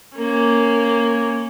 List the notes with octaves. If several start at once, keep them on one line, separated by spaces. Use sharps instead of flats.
A#3 C#4